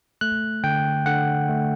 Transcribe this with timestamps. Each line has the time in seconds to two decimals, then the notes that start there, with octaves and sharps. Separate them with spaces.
0.21 A3 F#6
0.64 D3 G5
1.06 D3 F#5
1.49 A3